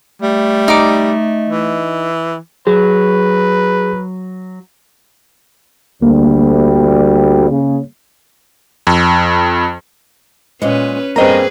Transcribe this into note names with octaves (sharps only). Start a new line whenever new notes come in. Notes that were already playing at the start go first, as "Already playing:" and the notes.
G3 A3
D#4 D6
E3
F#3 G#4 B4
D2 G3 A#3
C#3
F2
A#2 G#3 C#4 B4
G2 A#3 C4 C#4 G#4 B4 D#5 A#5